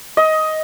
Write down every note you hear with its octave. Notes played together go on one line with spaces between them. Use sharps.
D#5